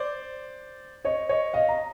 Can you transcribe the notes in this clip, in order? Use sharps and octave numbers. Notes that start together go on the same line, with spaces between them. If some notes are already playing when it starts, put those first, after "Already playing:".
Already playing: C5 D5
C#5 D#5
C#5 D#5
D#5 F5
A#5